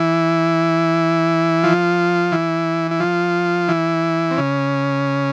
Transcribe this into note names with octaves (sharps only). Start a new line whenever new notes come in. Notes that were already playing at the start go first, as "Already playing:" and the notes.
Already playing: E3 E4
F3 F4
E3 E4
E4
F3 F4
E3 E4
C4
C#3 C#4